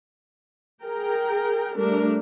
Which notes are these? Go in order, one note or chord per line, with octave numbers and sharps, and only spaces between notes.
G#4 A#4 G5
G3 A3 D4 A#4